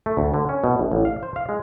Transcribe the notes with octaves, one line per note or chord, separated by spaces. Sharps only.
A3
D2
D3
C#4
B2
A#1
A1
F5
C5
F5
G#3